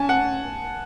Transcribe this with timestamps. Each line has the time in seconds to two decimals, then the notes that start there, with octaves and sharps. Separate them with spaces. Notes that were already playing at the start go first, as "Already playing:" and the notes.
Already playing: C#4 G#5 A5
0.09 F#5